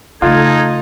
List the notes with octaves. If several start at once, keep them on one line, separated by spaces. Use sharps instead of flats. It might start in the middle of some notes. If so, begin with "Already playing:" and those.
C#3 A3 D#4 F4 A4 G#6